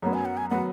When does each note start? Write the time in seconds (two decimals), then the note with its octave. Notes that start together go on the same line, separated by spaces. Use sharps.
0.02 F#2 F#3 B3 C#5
0.14 G#5
0.25 F#5
0.37 G#5
0.50 F#3 B3 F#5